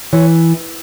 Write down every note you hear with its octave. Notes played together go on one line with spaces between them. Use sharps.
E3 C#5